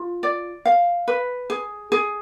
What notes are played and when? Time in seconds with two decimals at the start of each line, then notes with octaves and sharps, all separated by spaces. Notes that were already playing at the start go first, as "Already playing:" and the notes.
Already playing: F4
0.23 D5
0.66 F5
1.08 B4
1.50 G#4
1.92 G#4